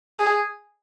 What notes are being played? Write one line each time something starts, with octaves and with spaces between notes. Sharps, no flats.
G#4